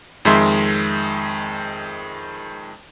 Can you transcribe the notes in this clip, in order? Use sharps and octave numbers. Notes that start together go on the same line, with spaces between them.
F2 D#3 G#3 E5 C6